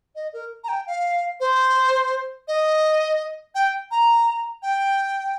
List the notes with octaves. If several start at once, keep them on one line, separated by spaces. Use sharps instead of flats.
D#5
A#4
A#5
G5
F5
C5
D#5
G5
A#5
G5